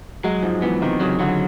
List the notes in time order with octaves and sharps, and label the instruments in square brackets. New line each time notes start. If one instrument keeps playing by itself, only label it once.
[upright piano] F#3 [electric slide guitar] G#3
[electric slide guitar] G#2 [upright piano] F3
[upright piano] E3 [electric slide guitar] B3
[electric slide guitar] C3 [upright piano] D#3
[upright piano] C#3 [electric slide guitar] F#3
[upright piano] D3 [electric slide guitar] F#3